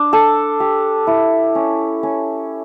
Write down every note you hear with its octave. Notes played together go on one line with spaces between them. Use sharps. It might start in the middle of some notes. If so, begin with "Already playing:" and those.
Already playing: D4
A4
G4
E4
C#4
C#4